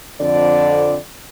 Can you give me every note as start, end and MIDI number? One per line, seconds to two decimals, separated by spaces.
0.20 0.97 41
0.20 0.97 50
0.20 0.97 74